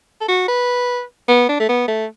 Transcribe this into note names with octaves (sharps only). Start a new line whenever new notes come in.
A4
F#4
B4
B3
D4
A3
B3
A3